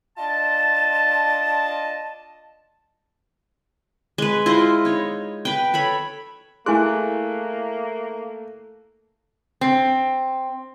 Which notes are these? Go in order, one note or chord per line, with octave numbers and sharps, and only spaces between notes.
D4 F4 D#5 A5
G#3 B4
E4 F4 C5 D#5
D#4 C#5
B4 G5
A4 C#5 B5
A3 A#3 E4 G#4 G#5 C6 F#6
C4